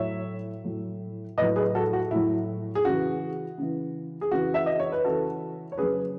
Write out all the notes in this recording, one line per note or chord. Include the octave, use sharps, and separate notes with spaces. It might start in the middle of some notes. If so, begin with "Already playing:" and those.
Already playing: A2 F#3 C#5 E5
A2 F#3
A2 F#3 B4 D#5
G#4 B4
F#4 A4
F#4
A2 F#3 E4
G#4
C#3 E3 F#4
C#3 E3
G#4
C#3 E3 F#4
E5
D#5
C#5
B4
C#3 E3 F#4 A4
C#5
C#3 F#3 G#4 B4